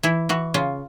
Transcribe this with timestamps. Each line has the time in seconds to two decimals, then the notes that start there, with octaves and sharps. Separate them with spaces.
0.03 E3 E4
0.29 E3 F#4
0.54 C#3 F4